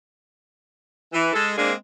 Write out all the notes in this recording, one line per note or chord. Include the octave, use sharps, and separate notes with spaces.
E3
G#3 A4
G#3 A#3 C4 D4 G#4